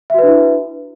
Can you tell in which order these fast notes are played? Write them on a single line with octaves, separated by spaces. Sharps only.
E5 F#4 B4 D4 E4